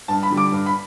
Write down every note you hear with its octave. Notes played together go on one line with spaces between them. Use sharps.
G2 A5
B5
D3 G3
D6
G2
B5